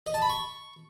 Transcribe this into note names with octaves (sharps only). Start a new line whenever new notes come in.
D#5
A5
B5
C#6